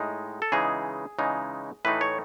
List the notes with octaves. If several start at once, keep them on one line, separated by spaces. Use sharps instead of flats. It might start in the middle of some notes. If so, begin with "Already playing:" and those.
Already playing: A2 G#3 D#4
A4
C#3 E3 G#3 D#4 G#4
C#3 E3 G#3 D#4
A2 E3 A3 D#4 B4
C#5